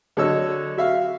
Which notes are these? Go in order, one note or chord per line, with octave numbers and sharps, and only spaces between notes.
D3 F#3 A4 C#5 D#5 E6
F#4 E5 F5